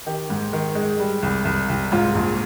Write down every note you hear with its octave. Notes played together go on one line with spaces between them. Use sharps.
D#3 G4
G#2
D#3
G#3
G3
C2
C2
C2
G#2 F4
A#1